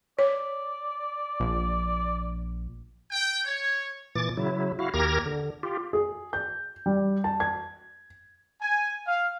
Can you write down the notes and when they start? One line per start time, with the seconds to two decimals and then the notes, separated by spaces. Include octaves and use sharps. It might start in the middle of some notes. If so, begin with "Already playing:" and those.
0.19 C#5 D5
1.40 A#1
3.11 G5
3.45 C#5
4.15 A#2 E3 D6 A6
4.37 C#3 F#3 E4
4.79 E4 F#4 F5
4.94 D#2 G4 A#4 A#5 G#6 A#6
5.26 D3
5.63 F4 G4
5.93 G#4
6.33 G6
6.86 G3
7.24 A5
7.40 G#6
8.62 G#5
9.06 F5